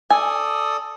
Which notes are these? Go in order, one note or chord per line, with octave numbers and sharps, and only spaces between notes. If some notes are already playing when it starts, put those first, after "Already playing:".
A4 D5 G#5 D#6